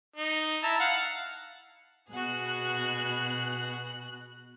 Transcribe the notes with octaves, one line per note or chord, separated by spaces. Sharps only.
D#4
E4 A5 A#5
F5 F#5
B2 F#4 G#4 F#6